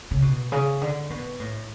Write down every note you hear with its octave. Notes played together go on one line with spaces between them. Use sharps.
C#3
B2
C#3
D3
B2
A2